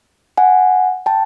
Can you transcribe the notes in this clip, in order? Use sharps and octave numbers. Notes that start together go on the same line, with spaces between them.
F#5 G#5
G5 A5